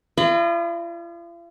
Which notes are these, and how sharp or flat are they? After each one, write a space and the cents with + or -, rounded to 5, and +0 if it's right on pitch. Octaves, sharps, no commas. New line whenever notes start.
F4 -45 D#5 -40 B5 +0